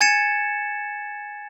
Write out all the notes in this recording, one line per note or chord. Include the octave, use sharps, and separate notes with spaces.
G#5 G#6 A6 C#7 E7